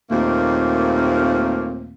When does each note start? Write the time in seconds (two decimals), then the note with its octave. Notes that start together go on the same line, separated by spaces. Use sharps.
0.11 D#2 A#2 A3 A#3 C4